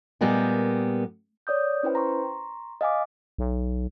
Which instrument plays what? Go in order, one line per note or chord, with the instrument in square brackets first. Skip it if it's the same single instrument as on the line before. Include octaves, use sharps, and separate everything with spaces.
[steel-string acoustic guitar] A#2 G3 G#3 B3 G4 A#4
[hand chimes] C#5 D5 D#6 G6
C#4 E4 B4 C5 G5
A#5 C6 C#6
D#5 F5 G#5 D6
[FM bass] B1